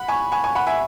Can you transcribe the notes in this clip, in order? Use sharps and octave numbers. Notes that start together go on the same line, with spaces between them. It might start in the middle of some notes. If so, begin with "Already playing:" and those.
Already playing: F#5 B5
G#5 C#6
G#5 C#6
G#5 C#6
F#5 B5
E5 G#5